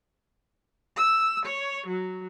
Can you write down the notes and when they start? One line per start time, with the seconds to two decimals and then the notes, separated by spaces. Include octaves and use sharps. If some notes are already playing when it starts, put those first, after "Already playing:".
0.96 E6
1.45 C#5
1.87 F#3